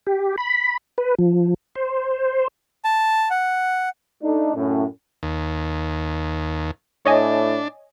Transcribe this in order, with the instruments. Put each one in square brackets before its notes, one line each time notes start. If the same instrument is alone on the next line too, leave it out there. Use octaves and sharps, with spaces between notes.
[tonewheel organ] G4
B5
B4
F3
C5
[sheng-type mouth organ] A5
F#5
[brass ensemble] A3 D4 D#4
F#2 A2 C#4
[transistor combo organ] D#2
[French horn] A2 [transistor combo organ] D4 [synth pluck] C#5 D#5 G#5